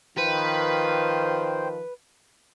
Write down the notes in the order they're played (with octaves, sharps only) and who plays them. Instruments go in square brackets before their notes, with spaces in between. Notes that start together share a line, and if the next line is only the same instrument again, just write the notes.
[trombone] D#3 [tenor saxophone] F3 [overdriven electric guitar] B4 [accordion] C5 G5